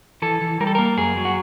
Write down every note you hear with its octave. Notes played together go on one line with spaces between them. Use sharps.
E3 A4
E3
G3 A#4
A4
A#3 A#4
F#2 G#4
F#3
F#4